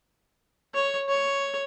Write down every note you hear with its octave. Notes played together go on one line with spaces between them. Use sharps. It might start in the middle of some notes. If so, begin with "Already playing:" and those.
C#5
C#5